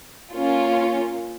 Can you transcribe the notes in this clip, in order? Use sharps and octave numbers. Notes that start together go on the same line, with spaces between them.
A#3 C#4 F4